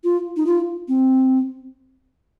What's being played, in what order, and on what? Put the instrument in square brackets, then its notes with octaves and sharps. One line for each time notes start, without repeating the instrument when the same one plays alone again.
[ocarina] F4
D#4
F4
C4